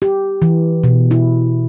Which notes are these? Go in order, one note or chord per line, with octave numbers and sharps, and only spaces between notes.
G4
E3
B2
E4